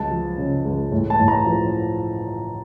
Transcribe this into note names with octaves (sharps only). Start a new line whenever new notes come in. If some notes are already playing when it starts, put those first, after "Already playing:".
Already playing: C#2 F#3 A5
F3
C#3
C#2
A2
A5
A2
A#5
F3